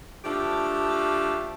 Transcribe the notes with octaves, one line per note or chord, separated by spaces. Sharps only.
F3 A3 D4 G4